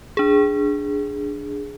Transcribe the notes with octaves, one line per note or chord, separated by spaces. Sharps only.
D4 G#4